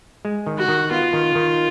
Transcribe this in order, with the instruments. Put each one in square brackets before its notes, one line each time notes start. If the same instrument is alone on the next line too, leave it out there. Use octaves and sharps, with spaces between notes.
[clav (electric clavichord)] G#3
D#3
[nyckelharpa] F#4
[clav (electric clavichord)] D#3
[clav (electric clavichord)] B3 [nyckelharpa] F4
[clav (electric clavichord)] D#3
D#3